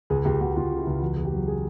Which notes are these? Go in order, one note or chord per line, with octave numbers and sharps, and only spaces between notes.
C#2 G#4
C#2 G4
C#2 F#4
C#2 F4
C#3
E4
C#2
E2 F#4
E2
G4
F#3
G#4